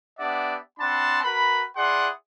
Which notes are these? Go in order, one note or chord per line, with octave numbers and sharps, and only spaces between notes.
B3 D4 G4 D5 E5 F#5
C4 D4 F#5 A5 B5 C6
F#4 A#4 B4 B5
E4 G#4 D5 F#5 C6